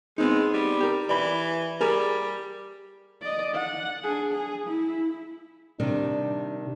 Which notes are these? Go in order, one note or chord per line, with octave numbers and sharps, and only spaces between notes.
G#3 B3 C4 D#4
G3
G4 A#4
E3 D5 B5
G3 G#4 A#4
D5 D#5
F#5
D4 G#4
G#4
E4
C3 D#3 G3 D4